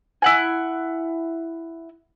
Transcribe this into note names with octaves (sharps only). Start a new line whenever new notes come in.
E4 F#5 G#5